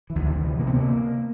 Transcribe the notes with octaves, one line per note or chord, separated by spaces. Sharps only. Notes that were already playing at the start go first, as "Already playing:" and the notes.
E3
D2
D3
C3
E3
C3 A#3
C4
A#3